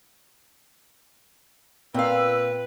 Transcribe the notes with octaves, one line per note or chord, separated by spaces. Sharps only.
A#2 C4 B4 F5 E6